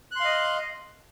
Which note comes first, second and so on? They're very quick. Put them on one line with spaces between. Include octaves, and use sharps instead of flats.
F#6 C6 F5 D#5